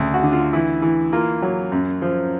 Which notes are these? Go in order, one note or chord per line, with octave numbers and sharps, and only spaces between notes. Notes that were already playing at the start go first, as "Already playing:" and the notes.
Already playing: D2 C#3
F#4
D3
F4
E3 E4
E3
A#3 F4
F#3
F#2
F3